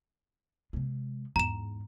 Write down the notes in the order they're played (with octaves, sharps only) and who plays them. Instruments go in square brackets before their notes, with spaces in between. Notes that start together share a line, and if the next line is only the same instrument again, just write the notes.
[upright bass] C3 G#3
[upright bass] E2 G#2 [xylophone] A#5 E7